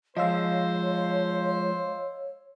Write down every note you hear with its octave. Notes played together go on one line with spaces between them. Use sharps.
F3 G#3 C5 C#5 D#5 F5 E6